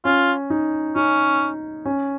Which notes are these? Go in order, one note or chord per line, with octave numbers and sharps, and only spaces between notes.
C#4 F4
D#4
C#4 D#4
C#4